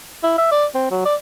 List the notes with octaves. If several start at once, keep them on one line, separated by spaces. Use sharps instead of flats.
E4
E5
D5
C4
F#3
D5